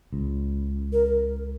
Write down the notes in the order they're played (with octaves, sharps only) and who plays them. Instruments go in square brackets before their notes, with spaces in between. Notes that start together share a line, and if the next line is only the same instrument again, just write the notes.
[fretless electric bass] C#2
[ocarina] A#4
A#4